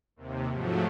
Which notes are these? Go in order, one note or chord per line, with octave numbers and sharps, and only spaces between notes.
D#2 C3
G#2 F3 F#3 A3